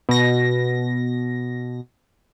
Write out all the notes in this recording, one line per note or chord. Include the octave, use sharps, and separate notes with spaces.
B2 A#6